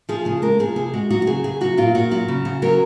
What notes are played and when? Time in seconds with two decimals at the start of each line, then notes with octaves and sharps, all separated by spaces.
0.09 F3 G#4
0.25 C#3 G#4
0.42 G#3 A#4
0.59 F3 G#4
0.76 C3 G#4
0.93 G#3 F#4
1.11 F#3 F#4
1.22 F#4
1.27 C#3 G#4
1.44 C#3 G#4
1.61 F#3 F#4
1.78 A#2 F4
1.95 A#2 F#4
2.11 F#3 F#4
2.28 C#3
2.45 C#3
2.62 F#3 A#4